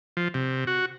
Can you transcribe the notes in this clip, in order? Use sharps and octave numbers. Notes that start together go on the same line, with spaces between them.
F3
C3
F#4